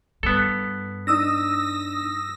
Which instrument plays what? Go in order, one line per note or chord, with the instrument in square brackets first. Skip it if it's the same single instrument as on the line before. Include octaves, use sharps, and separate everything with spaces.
[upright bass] G2 [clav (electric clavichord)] B3 A4
[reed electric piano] D4 D#4 [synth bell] D#6 E6 A#6